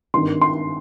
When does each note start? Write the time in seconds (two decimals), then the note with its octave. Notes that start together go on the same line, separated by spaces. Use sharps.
0.14 G#1 G2 D#3 C6
0.41 C6